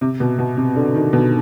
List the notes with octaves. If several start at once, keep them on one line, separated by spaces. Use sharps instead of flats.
C3
B2
B2
C3
D3
D#3
B2